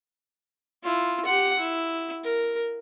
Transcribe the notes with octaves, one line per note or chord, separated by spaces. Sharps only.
E4 F4
G4 F#5
E4
A#4